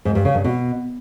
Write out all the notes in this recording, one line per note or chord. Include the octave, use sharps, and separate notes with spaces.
G#2
G2
C#3
G2
B2